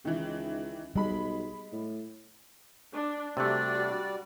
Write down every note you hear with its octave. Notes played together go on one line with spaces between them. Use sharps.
C#2 D#3 E3
B1 G3 G#3 B5
A2
D4
C3 G3 A3 D4 F#4 D5